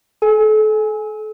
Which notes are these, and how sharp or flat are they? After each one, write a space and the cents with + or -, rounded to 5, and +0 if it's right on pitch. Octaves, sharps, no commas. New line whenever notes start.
A4 -35 G#5 +5